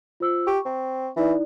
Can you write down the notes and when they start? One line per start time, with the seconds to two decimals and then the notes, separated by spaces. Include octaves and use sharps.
0.20 F4 C5 E6
0.47 G4 C#6
0.65 C4
1.17 E3 D#4 E4 D5